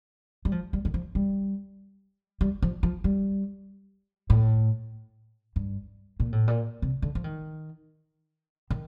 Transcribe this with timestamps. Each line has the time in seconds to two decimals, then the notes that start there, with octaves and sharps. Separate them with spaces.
0.45 G3
0.52 F3
0.73 G3
0.85 D#3
0.94 F3
1.15 G3
2.41 G3
2.62 F3
2.83 F3
3.04 G3
4.30 A2
5.56 G2
6.20 A#2
6.32 A2
6.48 A#2
6.82 C3
7.02 D3
7.15 F3
7.24 D#3
8.70 D#3